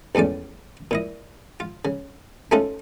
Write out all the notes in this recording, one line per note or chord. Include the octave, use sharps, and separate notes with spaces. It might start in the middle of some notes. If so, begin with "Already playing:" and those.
A#1 E2 A2 C#4 D5
A#2 E4 D#5
F4
C#3
A3 C#4 D#4 F4 F#4 A4